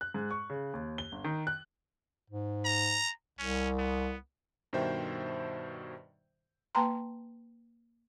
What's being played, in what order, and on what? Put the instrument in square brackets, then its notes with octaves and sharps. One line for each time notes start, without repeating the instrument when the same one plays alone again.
[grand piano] F#6
G#2
C#6
C#3
D#2
G7
G1
D#3
F#6
[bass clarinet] G#2
[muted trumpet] A#5
[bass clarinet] C2 [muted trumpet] C#4
[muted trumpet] B3
[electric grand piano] G2 B2 D#3 C5 E5 G5
[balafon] A#3 B4 G5 A5 A#5 C6